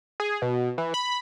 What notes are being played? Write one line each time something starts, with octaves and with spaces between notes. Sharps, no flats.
G#4
B2
E3
B5